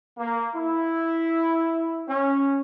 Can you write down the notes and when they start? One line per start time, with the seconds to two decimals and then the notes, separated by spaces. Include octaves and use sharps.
0.18 A#3
0.54 E4
2.09 C#4